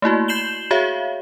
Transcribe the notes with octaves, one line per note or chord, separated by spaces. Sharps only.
A3 A#3 E4 F#4
G6 C7 E7 F#7 G7
F#4 G#4 C#5 E5 F5